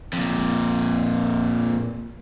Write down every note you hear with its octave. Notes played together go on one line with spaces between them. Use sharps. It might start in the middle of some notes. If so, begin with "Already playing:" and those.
F2 A#2